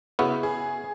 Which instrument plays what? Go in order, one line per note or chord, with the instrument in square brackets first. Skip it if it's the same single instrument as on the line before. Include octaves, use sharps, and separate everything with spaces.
[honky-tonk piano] C#3 [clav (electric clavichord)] B3 E4 F#4
[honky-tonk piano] G#4